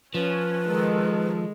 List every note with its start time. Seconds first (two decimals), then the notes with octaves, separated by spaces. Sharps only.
0.15 F3 C#4 B4
0.67 D#3 G#3 A4